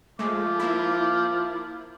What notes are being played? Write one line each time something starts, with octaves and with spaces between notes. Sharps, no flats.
F3 G#3 A3 D6
A#3 E4